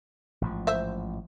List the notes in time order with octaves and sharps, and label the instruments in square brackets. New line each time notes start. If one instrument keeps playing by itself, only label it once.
[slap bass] A1 G#2 F3
[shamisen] C5 E5